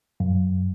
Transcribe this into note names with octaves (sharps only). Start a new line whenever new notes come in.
F#2